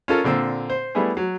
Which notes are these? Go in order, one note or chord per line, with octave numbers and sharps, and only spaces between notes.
C#4 F4 A4 A#4
A#2 D3 C4 E6
C5
G3 A3 B3 E4 G#4
F#3